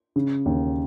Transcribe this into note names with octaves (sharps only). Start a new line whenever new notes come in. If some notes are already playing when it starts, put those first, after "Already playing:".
C#3
D#2